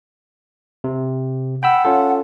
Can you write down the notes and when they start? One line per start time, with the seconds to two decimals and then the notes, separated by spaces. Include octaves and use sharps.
0.84 C3
1.63 F#5 G5 B5 E6
1.85 C#4 F4 A4